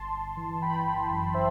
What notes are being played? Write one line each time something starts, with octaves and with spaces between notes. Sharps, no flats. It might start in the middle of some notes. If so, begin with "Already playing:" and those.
Already playing: G1 A5 C6
G1
E3
E3 G5 B5
G1
F#2
C5 E5